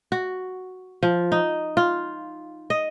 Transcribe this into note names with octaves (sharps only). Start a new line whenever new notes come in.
F#4
F3
D#4
F4
D#5